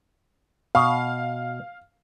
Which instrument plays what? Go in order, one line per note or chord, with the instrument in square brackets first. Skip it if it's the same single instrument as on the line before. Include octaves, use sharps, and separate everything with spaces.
[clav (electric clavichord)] B2 [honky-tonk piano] F5